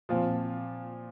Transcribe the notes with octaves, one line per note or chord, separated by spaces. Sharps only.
A#2 F3 C4 F4